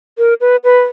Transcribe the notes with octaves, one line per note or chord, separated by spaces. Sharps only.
A#4
B4
B4